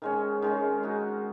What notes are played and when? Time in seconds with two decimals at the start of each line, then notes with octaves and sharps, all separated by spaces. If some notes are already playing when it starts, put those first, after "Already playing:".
0.02 D#3 G#3 C#4
0.42 D#3 G#3 C#4
0.83 G#3 D#4 F#4